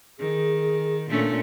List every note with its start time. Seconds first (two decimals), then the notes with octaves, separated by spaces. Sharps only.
0.19 D#3 G#4
1.10 A#2 A3 C#4 D4